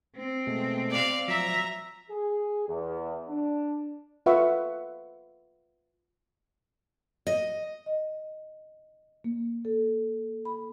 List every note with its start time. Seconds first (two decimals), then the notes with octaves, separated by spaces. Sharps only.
0.17 C4
0.47 B2 G#3 A3
0.90 D5 F5
1.28 F3 F#3 E5 A#5 E6
2.11 G#4
2.69 E2
3.29 D4
4.26 F4 B4 E5 F#5 C#6
7.27 D#5
7.86 D#5
9.24 A#3
9.65 A4
10.45 B5